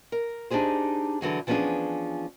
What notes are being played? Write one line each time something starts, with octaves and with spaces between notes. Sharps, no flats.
A#4
D4 D#4 G4 G#4 C5
D3 E3 F#3 G#4
E3 F3 B3 C#4 D4 G#4